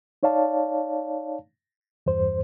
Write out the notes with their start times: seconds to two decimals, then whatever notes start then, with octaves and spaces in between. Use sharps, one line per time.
0.23 D#4 C#5 D5 F5 A5
2.06 E2 G2 C5